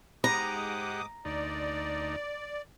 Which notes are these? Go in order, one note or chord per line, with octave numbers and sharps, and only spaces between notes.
G#2 G#3 G4 F#5 A#5 D6 D#6
D2 D#4 D5